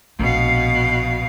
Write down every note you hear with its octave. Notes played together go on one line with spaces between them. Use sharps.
A#1 B2 F5